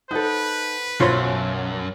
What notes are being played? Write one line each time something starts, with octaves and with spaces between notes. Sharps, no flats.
D#4 A4 B4 C5 F#5 G6
B1 F#2 F#3 F4 C5 C#5 C6